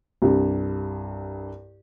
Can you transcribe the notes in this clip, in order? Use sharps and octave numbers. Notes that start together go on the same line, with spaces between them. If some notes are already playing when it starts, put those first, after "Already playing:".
C2 G2